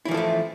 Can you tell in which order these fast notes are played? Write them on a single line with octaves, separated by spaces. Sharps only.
E4 E3 F3 A4 A3